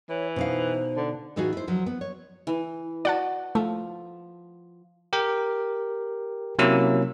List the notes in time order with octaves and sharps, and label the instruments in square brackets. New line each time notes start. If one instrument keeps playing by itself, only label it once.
[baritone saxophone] E3 [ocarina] C#5
[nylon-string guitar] B2 D#4 F5 [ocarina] C5
[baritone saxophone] D3
[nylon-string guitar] A2 E3 D#4 F4 F#4 G#4
E4 C5
D2 F3 F#3
B3
C#5
[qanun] E3
[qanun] F#4 [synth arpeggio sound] D5 F#5 A5
[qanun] F3 [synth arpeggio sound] A3
[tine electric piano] G4 A#4 G5
C3 F#3 A#3 C#4 E4 E6